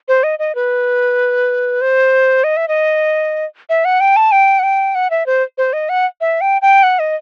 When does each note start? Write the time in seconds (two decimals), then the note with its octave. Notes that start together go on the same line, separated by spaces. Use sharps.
0.08 C5
0.23 D#5
0.39 D#5
0.55 B4
1.81 C5
2.44 D#5
2.57 E5
2.68 D#5
3.69 E5
3.85 F#5
4.00 G5
4.16 A5
4.32 G5
4.59 F#5
4.63 G5
4.95 F#5
5.10 E5
5.26 C5
5.58 C5
5.73 D#5
5.89 F#5
6.21 E5
6.41 G5
6.62 G5
6.83 F#5
6.99 D#5